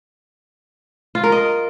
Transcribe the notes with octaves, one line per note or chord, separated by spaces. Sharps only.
F4
A#4
D#5